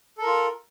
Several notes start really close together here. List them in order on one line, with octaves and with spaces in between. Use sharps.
A4 A#4 F4